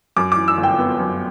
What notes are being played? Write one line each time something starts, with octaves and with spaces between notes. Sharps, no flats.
F#2 D6
D6
E3
E6
G1
G5
B3
F#2